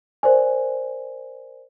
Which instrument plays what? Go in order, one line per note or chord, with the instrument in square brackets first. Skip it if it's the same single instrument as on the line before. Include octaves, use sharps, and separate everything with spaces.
[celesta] A#4 C5 D5 G#5